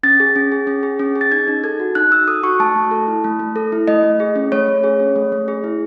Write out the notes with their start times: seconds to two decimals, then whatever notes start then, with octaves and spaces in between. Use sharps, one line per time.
0.03 C#4 A6
0.20 G#4
0.36 C#4
0.52 G#4
0.67 C#4
0.83 G#4
0.99 C#4
1.16 G#4
1.21 A6
1.32 D#4 G#6
1.48 D#4
1.64 A4 G#6
1.80 F#4
1.95 D#4 F#6
2.11 D#4 E6
2.27 A4 D#6
2.43 F#4 C#6
2.60 A3 A5
2.76 A3
2.91 A4
3.08 E4
3.24 A3
3.39 A3
3.56 A4
3.72 E4
3.88 A3 D#5
4.03 A3
4.20 G#4
4.36 C#4
4.52 A3 C#5
4.68 A3
4.84 G#4
4.99 C#4
5.16 A3
5.32 A3
5.48 G#4
5.64 E4